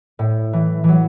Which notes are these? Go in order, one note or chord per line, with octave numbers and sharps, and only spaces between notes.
A2
E3
E3 F#3